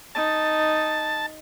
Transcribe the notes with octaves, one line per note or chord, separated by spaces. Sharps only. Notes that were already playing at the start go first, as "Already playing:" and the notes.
D#4 A5